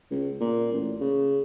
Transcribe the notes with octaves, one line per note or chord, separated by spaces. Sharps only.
C#2
A#2
A1
C#3